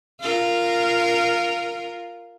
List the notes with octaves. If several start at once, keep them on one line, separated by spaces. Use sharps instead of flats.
F4 A#4